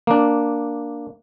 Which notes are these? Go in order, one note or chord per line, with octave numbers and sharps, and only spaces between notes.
A#3 D4